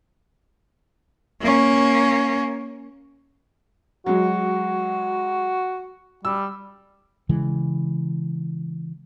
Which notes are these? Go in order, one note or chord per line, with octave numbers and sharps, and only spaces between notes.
A#3 C#4
F#3 G#3 F#4
G3 E6
C#3 E3 G#3